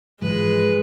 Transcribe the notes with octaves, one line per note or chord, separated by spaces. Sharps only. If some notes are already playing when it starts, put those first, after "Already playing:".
G#2 E3 F3 G#3 B4